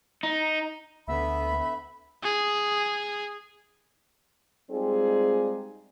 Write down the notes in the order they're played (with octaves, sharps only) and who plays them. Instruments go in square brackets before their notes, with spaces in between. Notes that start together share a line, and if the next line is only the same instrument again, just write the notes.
[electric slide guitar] D#4
[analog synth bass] D2 [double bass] D3 B3 [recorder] E5 [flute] B5
[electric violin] G#4
[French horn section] G3 G#3 C4 D#4 F4 G#4